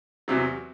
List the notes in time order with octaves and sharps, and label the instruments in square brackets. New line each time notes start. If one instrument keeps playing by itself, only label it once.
[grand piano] E2 C3 F#3